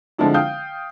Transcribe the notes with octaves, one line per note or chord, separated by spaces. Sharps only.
D3 F3 G#3 C4 D4 E4
F5 G5 D#6 G6